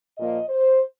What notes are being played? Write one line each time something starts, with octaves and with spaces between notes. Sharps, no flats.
A#2 F3 A#3 D#5
C5